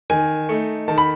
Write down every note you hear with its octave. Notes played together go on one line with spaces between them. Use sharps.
D#3 G#5
A3 D#4
D#3 A5
B5